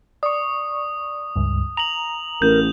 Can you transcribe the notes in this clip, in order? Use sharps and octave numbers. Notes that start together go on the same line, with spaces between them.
D5 C#6 D#6
C#2 G2
A#5 F7 F#7
A1 A#4 G6